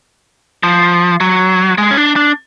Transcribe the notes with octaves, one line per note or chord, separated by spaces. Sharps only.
F3
F#3
G#3
C#4
D4
D4